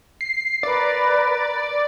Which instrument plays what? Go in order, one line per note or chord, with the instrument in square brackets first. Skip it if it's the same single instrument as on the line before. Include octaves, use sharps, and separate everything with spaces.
[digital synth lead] C7
[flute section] A#4 B4 [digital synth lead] D5